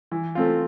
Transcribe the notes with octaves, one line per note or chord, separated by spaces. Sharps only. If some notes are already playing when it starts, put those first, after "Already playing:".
E3
A3 C4 F4